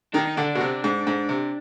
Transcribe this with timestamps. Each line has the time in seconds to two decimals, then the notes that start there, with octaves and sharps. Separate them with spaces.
0.14 D#3 D4
0.27 D#4
0.37 D3 D4
0.55 B2
0.61 C3
0.84 G#2
1.07 G#2
1.29 C3